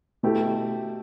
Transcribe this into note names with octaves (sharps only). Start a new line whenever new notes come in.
B2 A3 E4 G4